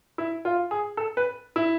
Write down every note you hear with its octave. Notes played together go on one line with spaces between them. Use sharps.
E4
F4
G#4
A4
B4
E4